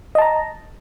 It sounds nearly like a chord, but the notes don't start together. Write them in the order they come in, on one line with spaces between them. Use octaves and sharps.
D#5 A5 A#5